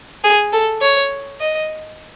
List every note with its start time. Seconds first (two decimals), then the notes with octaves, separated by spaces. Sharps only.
0.24 G#4
0.52 A4
0.82 C#5
1.40 D#5